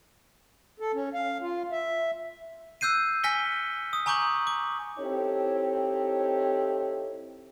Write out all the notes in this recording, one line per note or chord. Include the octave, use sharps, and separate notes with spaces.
A4
C#4
F5
F4
E5
E6 F#6 G6 C7 D#7
G#5 F6 A#6 B6 C#7 G7
D#6
G#5 A#5 C#6 D6 G6 F#7
D6
C4 D#4 E4 G4 A4 C#5